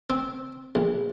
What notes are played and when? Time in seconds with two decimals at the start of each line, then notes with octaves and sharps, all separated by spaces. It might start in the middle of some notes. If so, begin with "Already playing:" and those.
0.10 C4
0.75 A#1